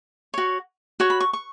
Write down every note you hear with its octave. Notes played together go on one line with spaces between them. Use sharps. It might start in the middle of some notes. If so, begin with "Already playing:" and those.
F#4 C#5
F#4 C#5 C#6
B5
C#6
C#6